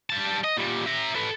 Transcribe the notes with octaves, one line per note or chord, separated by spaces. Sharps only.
G3 A5
D#5
A#2 G3
E5 A#5
A4 B4